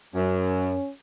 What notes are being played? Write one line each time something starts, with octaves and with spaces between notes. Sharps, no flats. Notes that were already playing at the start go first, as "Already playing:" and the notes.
F#2 C#4